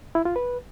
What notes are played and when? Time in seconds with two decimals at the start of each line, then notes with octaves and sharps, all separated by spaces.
0.15 E4
0.25 F4
0.36 B4